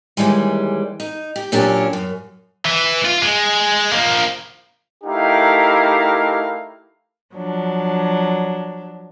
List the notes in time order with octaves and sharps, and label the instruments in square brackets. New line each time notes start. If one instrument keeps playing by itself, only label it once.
[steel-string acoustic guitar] D#2 A2 E3 G3 G#3
D#4
G4
A#2 F#3 A#3 C#4 D4 G4
F#2
[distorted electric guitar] E3
F4
G#3
F3 A#3
[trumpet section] A3 D#4 E4 G4 A#4 F5
[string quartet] F3 F#3 D4